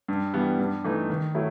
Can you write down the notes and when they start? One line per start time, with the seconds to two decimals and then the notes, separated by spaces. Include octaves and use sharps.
0.08 G2
0.34 E3 G3 B3
0.59 G2
0.84 E3 A3 D#4
1.10 D#3
1.35 F#3 A3 E4